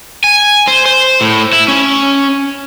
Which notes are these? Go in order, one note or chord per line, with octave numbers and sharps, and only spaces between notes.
G#5
C5
C5
A2
E4
C#4